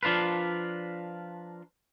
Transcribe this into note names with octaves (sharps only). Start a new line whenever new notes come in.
F3 D4 F4 A#4 B4